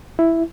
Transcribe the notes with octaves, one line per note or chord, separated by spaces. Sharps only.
E4